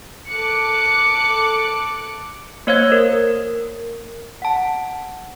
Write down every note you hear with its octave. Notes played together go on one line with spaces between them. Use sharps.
A4 D6 F#6 C#7
A#3 C5 C#5 F5 E6 G#6
A#4
F#5 A5